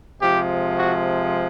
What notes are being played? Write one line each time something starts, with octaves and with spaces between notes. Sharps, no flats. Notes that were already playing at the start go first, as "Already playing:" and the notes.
C3 F3 G#3 G4
F#4